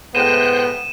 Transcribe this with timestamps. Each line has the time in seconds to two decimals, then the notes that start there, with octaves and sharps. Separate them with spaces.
0.15 A2 G#3 B3 C5 G5 F#6 D#7 E7